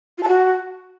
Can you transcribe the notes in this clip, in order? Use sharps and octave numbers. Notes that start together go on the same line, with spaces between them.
F4
A5
F#4